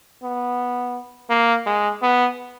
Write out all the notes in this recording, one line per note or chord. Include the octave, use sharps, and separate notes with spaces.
B3
A#3
G#3
B3